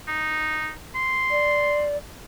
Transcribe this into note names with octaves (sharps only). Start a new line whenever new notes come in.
D#4
C6
D5